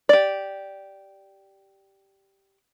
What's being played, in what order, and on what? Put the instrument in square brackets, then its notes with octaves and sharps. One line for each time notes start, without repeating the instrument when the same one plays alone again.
[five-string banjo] G4 D5